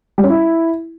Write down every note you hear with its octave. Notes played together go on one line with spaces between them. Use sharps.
G3
C#4
E4